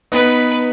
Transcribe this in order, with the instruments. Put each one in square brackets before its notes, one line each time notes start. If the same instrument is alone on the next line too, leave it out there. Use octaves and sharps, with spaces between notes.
[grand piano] B3 D#4 [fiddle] B4